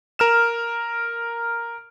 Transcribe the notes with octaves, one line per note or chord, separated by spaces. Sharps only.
A#4 F6 E7